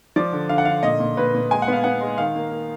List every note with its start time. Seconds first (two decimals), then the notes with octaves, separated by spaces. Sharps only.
0.16 F3 D5
0.33 D3
0.49 D3 F5
0.58 F#5
0.65 D3 F5
0.83 A#2 D#5
1.00 A#2
1.17 A#2 B4
1.35 A#2
1.51 G#3 G#5
1.62 F#5
1.68 B3 F5
1.84 B3 F#5
2.01 G#3
2.18 D#3 F5
2.35 A#3
2.51 A#3